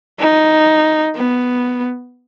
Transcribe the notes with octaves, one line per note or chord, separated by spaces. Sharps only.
D#4
B3